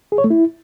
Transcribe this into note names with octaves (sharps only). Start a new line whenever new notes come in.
G#4
C#5
A3
E4